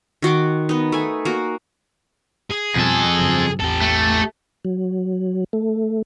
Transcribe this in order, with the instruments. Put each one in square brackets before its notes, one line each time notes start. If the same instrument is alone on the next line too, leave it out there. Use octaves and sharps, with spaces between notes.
[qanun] D#3 F#4 C6 D6
B3 D#4
A3 G#5
A#3 F#4
[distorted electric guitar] G#4
[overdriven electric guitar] F2 A4 [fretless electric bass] B2 G3
[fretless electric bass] G2 C#3 F#3
[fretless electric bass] A1 E2 C4 [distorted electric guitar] G4 A4
[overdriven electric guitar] A3
[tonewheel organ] F#3
A3